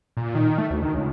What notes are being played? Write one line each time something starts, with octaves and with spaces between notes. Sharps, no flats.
A#2
D#3
A3
D2
D#3
C#2